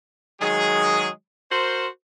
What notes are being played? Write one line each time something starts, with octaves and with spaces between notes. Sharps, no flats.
D#3 F#3 G#3 G#4
F#4 A#4 C5